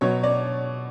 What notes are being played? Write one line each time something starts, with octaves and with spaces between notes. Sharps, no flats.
B2 F#3 C#5
D5